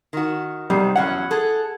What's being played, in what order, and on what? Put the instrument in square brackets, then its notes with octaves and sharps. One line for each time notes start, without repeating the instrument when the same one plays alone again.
[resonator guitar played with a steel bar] D#3 F#4
[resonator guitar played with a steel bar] G#2 C3 [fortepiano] G3
[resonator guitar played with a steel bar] E2 F#3 C#4 [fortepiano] F#5
[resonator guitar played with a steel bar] G#4 A4